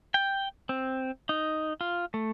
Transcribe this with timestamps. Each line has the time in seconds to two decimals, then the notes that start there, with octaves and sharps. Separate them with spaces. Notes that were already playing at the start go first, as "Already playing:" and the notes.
0.14 G5
0.69 C4
1.29 D#4
1.81 F4
2.14 A3